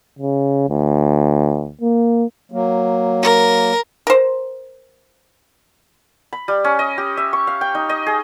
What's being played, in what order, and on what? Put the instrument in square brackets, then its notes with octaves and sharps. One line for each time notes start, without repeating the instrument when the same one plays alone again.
[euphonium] C#3
D2
A#3
[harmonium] F#3 A#3
[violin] A#4
[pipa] A#4 C5
[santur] B5
G3
C#4
D#5
G4
E5
C#6
F5
G5
D#4
D#5
G#4